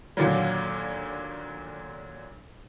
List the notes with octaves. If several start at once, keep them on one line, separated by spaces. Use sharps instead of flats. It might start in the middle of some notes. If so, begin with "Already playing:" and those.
D#2 A#2 D3 F#3